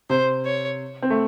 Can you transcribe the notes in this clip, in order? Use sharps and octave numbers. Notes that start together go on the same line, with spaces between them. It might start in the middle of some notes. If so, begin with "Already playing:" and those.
C3 C5
C#5
C4
A3